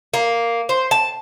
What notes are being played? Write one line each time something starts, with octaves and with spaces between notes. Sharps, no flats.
A#3
C5
A5